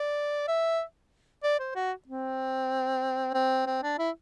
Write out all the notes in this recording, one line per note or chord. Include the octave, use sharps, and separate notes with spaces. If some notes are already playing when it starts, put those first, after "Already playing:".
Already playing: D5
E5
D5
C5
F#4
C4
C4
C4
D4
E4